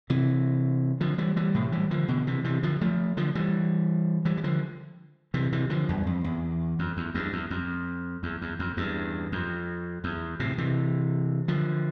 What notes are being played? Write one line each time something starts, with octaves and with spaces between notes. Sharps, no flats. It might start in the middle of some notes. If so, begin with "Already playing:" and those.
C3 E3
D3 F3
E3 G3
E3 G3
A2 C3
E3 G3
D3 F3
B2 D3
C3 E3
C3 E3
D3 F3
F3 A3
D3 F3
E3 G3
E3 G3
G3
D3 F3
C3 E3
C3 E3
D3 F3
E2 G2
F2
E2
F2
E2
E2 G2
E2
F2
E2
E2
F2
E2 G2
F2
E2
A2 C3
C3 E3
D3 F3